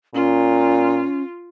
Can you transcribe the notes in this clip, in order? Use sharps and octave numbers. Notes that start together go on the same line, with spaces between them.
A#2 C#4 F4